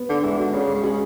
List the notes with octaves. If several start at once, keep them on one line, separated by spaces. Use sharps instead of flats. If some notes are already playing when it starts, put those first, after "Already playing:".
Already playing: B3
D3 D4
E3 G#3
D3 F#4
C#3 C#4
G#3
C#3
B2 G#4
C#3